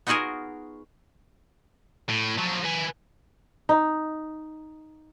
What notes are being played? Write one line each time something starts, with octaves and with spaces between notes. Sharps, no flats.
B3 D#4 F4 F#4 G#4 A#4
A2
F3 F#3
B4 G#5
D#4